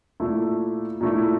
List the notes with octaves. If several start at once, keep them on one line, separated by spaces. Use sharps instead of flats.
A#2 A3 E4
A#2 A3 E4